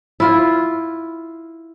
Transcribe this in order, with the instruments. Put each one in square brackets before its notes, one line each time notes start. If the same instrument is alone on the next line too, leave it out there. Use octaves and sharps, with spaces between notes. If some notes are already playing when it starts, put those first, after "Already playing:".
[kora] E4 F4